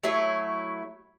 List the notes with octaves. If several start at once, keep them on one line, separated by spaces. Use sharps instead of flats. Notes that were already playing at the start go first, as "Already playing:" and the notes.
F#3 A3 E4 C#5